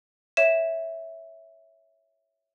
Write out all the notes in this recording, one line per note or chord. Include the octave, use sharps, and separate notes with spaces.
C#5 E5 E7